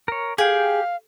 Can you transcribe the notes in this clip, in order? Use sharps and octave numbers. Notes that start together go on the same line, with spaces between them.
A#4 C#5
G4 G#4 F5 G5